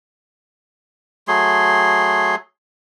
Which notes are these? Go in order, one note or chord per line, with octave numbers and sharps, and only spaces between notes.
F#3 A3 G#4 C6